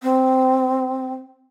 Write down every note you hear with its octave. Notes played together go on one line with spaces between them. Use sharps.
C4